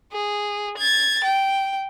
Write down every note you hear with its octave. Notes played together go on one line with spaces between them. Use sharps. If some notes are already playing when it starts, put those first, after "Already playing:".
G#4
G#6 A6
G5